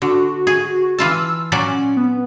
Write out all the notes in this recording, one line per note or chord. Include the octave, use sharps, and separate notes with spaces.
D3 F#4
G#4
E3 F4 A5 E6
A#2 F#3 C#4 D5
B3